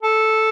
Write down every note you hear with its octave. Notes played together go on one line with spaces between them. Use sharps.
A4